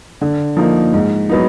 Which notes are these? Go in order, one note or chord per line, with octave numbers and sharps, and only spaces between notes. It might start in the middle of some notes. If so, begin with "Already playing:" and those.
D3
F3 A#3 D#4
G#2
F#3 B3 D#4